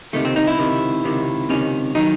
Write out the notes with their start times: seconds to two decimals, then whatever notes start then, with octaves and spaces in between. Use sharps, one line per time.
0.13 C#2 C3 D#3 A3
0.25 C4
0.36 D#4
0.47 E4
0.59 C#2 C3 D#3
1.04 C#2 C3 D#3
1.49 C#2 C3 D#3 C#4
1.95 D#3 F#3 D#4